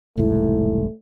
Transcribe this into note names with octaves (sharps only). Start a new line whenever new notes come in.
E1 C2 G#2 A3 E4